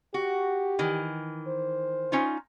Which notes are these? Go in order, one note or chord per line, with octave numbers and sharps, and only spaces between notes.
F#4 G4
D#3 E3
C5
C#4 D#4 F4